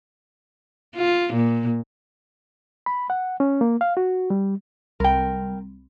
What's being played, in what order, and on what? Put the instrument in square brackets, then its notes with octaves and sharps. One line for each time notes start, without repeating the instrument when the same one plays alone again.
[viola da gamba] F4
A#2
[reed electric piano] B5
F#5
C#4
A#3
F5
F#4
G3
[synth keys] C2 [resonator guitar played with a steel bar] A#4 G5